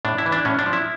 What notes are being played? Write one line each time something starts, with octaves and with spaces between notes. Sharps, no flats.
A2 D4
E4
E3
D4
A2 C#4
D4
F3
E4